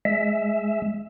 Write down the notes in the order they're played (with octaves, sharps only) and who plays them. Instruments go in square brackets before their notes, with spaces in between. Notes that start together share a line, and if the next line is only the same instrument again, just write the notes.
[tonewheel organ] G#3 E5